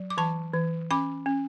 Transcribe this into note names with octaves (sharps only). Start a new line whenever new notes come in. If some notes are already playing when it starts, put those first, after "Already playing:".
Already playing: F#3
D6
E3 A5 C#6
E3
C#4 B5 D6
C#4